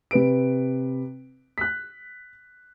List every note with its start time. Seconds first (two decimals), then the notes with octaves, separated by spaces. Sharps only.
0.11 C3 B4 D7
1.58 F#6 B6